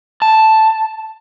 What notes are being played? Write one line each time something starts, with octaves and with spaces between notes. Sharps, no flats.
A5